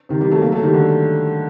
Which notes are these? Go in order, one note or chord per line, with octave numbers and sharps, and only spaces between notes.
C3 D#3
D#3 G3
F#3 A3
G3 A#3
F#3 A3
D#3 G3
D3 F#3